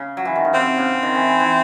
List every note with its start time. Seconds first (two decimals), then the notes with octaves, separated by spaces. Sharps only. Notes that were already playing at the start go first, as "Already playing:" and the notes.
Already playing: C#3
0.17 F#3
0.25 E3
0.35 D#3
0.45 C#3
0.53 C3 C4
0.78 C#3
1.03 D#3
1.15 E3
1.27 E3
1.40 E3